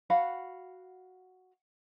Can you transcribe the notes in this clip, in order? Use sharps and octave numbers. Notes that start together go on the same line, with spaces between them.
F#4 F5 F#5 B5